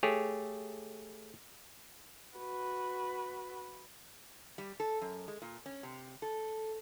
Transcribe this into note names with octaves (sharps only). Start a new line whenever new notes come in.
A3 G4 G#4 C#5
F#4 B4
G3
A4
F#2
G#3
A#2
C#4
C3
A4